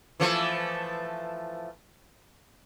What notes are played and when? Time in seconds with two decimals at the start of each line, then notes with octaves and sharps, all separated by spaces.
0.20 E3 F3 A3